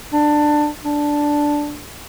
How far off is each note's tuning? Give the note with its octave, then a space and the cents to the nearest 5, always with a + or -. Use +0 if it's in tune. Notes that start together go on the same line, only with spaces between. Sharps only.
D4 +15
D4 +0